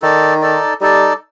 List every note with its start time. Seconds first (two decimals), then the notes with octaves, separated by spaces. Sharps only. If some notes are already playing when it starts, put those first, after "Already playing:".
0.02 D#3 D#4 A4 D5
0.42 D#4 A4 D5
0.81 G3 D#4 A4 D5